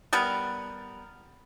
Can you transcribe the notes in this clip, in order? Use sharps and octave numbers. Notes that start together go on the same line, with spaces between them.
G3 B3 A#4 B4